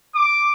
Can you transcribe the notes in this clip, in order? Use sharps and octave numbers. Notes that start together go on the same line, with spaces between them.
D6